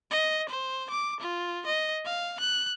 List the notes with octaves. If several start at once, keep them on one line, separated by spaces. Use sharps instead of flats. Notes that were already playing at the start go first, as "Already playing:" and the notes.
D#5
C5
D6
F4
D#5
F5
F#6